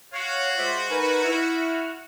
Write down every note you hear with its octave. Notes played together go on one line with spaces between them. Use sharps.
F#4 C#5 F5
G#3 F4 C5 D5 E5
D#4 A#4 B4 G#5
E4 F6